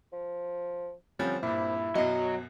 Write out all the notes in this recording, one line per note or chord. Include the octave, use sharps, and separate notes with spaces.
F3
D3 F3 G3 C4 C#4
G2 A#2 E4
F#2 B2 F#3 D#5